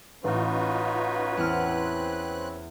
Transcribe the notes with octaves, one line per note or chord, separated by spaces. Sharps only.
A1 C#4 D#4 F4 F#4 B4
E2 C4 F6 F#6